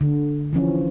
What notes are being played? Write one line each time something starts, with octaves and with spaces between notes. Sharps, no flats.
D3
E3 F3 C#4